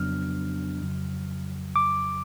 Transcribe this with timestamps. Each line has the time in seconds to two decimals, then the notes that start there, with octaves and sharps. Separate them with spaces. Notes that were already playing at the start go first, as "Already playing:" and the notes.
Already playing: F2 C#3 F#3 B3 D4 F6
0.81 F2 C#3 F#3
1.76 D6